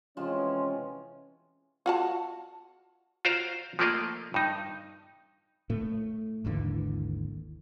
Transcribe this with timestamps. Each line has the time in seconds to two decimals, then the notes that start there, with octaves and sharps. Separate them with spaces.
0.17 C3 E3 F3 G#3 C#4
1.86 F4 F#4 A5
3.25 F4 F#4 C5 D5 F5 A#5
3.79 F3 A3 A#3 D5 D#5 F5
4.34 G2 D#4
5.70 A2 A3
6.45 G#1 D#2 D3 E3